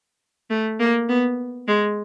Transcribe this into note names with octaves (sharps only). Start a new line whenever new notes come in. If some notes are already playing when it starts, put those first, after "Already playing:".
A3
A#3
B3
G#3